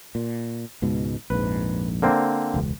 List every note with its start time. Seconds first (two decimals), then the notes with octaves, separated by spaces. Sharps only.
0.15 A#2
0.82 C#2 G#2 B2
1.30 A#1 F2 G#2 B4
2.02 D3 A#3 C4
2.54 E1 C#2